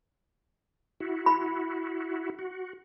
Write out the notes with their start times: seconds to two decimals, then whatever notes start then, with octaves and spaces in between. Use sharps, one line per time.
1.00 E4 F#4
1.26 B5
2.39 F#4